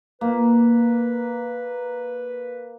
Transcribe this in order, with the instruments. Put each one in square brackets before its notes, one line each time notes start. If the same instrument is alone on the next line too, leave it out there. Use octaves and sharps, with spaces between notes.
[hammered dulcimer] A#3 [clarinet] B4